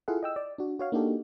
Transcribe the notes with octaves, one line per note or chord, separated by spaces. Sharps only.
E4 F4 G#4 A4 F5 F#5
D#5 G5 E6
D5
D4 F#4
F#4 C#5 F5
A#3 D4 D#4 F#4 G4 A4